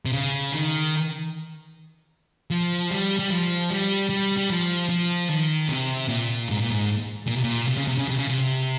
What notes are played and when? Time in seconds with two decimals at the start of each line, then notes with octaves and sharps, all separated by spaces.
0.05 C3
0.13 C#3
0.52 D#3
2.51 F3
2.91 G3
3.19 G3
3.30 F3
3.70 G3
4.10 G3
4.38 G3
4.50 F3
4.89 F3
5.29 D#3
5.68 C3
6.08 A#2
6.49 G#2
6.60 A#2
6.70 G#2
7.27 A#2
7.36 C3
7.44 A#2
7.68 C3
7.77 C#3
7.88 C3
7.98 C#3
8.09 C3
8.18 C#3
8.29 C3